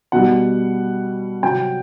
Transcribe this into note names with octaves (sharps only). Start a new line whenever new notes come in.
B2 G3 F#5
C3 F#3 G5